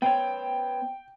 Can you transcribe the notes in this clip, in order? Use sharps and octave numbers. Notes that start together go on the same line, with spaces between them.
B3 C5 C#5 G5